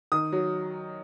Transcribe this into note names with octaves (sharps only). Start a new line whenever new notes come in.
D#3 D#6
F#3